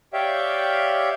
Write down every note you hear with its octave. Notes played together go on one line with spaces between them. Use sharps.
G4 C#5 D5 E5 F5 G5